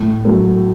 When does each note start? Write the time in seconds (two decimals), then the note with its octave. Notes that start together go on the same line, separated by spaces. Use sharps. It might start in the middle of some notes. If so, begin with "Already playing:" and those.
Already playing: A2
0.25 F#3 A3